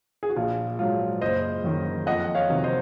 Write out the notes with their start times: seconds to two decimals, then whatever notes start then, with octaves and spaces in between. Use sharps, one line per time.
0.23 G#4
0.30 F#4
0.36 A#1 F4
0.79 G#2 F#3 F4
1.21 F#1 C5 D#5
1.64 F#2 D#3
2.06 F2 D#5 F#5
2.35 C#5 F5
2.50 C3 D#3 F#3
2.64 C5 D#5